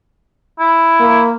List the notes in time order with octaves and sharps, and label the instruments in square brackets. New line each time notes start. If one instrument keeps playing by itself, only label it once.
[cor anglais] E4
[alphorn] A#3